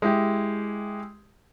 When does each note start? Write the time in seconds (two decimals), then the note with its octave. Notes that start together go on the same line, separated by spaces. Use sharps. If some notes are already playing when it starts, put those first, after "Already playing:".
0.02 G#3 E4 G4